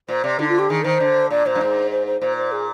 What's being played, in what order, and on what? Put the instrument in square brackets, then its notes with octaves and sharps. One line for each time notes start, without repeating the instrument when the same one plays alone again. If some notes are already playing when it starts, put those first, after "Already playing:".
[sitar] A#2 [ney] C5
[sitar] C3 [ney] D5
[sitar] D3 [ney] D#4
[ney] F4
G4
[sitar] D#3 [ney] G#4
[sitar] D#3 [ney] C5
[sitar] D3
[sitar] A#2 [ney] D5
[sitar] A#2 [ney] C5
[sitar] G2
G#2
[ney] C5
C5
[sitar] A#2 [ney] C5
[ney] C5
G#4